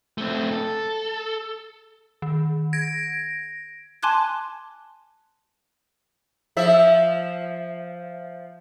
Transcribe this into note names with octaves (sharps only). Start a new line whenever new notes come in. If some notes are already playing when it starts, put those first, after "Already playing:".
A3 C4
A4
D#3
G#6 A#6 D7
G#5 A5 C6 D6 F#6 G#6
F3 E5